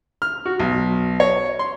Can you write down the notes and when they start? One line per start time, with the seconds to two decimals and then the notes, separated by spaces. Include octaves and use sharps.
0.22 F6
0.46 F#4
0.60 B1
1.20 C#5
1.59 C6